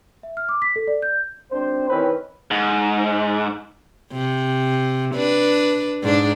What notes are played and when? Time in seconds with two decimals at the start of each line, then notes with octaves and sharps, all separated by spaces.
0.23 E5
0.37 F6
0.49 D6
0.62 B6
0.76 A4
0.88 D5
1.02 G6
1.50 G#1 C4 D4 C5
1.90 C3 D#3 E3 C4 C#4 B4
2.51 G#2
4.12 C3
5.15 D4 B4
6.03 G#2 D4